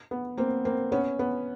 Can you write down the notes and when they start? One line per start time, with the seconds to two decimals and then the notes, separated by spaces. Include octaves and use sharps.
0.11 B3
0.37 A#3 C4
0.65 A#3 C4
0.92 B3 C#4
1.19 B3